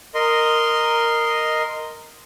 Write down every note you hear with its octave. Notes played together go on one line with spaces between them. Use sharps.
A#4 D#5 C6